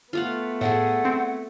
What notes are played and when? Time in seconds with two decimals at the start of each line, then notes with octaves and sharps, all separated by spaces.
0.13 A3 B3 F4 F5 F#5
0.61 A2 G#4 A4 F#5
1.05 C4